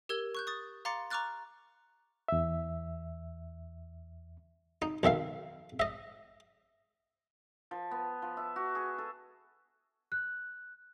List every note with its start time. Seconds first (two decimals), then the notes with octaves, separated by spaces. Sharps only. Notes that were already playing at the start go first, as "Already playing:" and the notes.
0.09 G4 A#4 E6 G#6 G7
0.35 C#6 F#6 G6
0.47 C#6 D#6 A6
0.85 F5 A#5 C6 D6 A6 C#7
1.11 A#5 C#6 D6 F6 F#6 A6
2.28 E2 E5
4.82 D#4
5.03 B1 D#3 E5 F5
5.80 D#5 E5
7.71 F3
7.91 B3
8.22 F3
8.37 E5
8.56 F#4
8.75 G#4
8.98 A4
10.12 F#6